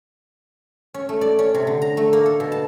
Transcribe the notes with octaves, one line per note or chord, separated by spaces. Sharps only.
C#4
A3
D5
C#4
C3
D3
A#5
A3
A#3
A4
B2
A5